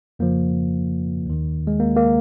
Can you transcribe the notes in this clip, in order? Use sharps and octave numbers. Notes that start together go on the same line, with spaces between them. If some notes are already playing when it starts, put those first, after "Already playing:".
F2 C#3 F3 A#3
D#2 D#3
G#3
A#3
A#3